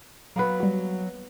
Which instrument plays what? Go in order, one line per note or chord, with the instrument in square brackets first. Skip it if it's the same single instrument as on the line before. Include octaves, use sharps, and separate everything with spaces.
[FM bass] F#3 [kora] A#3 B3 B4
[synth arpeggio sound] G3 F#4